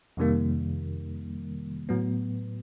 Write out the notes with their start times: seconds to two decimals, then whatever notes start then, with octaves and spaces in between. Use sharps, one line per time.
0.17 F2 C3 D#3 G3 A#3
1.89 A2 F#3 B3